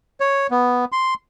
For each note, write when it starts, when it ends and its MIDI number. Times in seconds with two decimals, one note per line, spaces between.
0.20 0.47 73
0.51 0.85 59
0.92 1.14 84